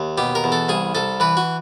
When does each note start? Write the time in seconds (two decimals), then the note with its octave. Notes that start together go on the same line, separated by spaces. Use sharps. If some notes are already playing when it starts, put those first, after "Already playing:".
Already playing: D#2
0.18 B2 G4
0.35 A#4
0.44 E2
0.52 A4
0.69 C2 G#4
0.95 C2 A4
1.20 E3 B4
1.37 F#4